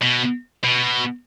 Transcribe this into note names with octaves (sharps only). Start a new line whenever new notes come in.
B2
B2